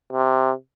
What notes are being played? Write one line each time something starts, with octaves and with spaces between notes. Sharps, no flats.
C3